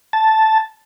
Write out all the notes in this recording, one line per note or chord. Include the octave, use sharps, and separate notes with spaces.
A5